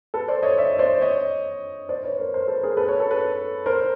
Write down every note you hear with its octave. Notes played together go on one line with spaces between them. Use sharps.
A4 B4
C5 D5
C#5 D#5
D5 E5
C5 D5
C#5 D#5
C5 D5
B4 C#5
A#4 C5
A#4 C5
A4 B4
G#4 A#4
A4 B4
B4 C#5
A4 B4
A4 B4
A#4 C5